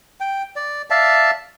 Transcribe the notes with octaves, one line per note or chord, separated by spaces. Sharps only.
G5
D5
D5 E5 F5 A5